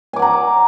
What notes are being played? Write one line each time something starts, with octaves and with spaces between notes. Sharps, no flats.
F#5 G#5 A#5 D6